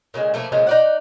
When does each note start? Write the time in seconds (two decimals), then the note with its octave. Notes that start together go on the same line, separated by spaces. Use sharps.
0.14 A#2 C#3 E3 G#3
0.34 F3 A3 A#3 E4
0.52 A#2 C#3 F3 G#3
0.66 D#4 D5 F#5